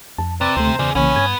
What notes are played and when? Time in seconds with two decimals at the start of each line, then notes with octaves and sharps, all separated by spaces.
0.18 F2 A5
0.41 C3 C4 B4 D5
0.56 D2 D3 A3 C5
0.79 E2 C#3 G#4 D5
0.95 B1 C#3 E3 A#3 B3 C#4 B4 G#5
1.16 G2 G#6